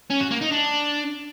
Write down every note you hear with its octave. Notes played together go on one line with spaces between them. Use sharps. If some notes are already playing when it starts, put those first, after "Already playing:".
C#4
F#4
A#3
D#4
D4